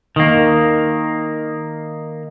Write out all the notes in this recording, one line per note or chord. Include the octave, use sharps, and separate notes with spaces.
D#3 A#3